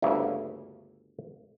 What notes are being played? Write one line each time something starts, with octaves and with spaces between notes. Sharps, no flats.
G1 D2 C#3 A#3 E4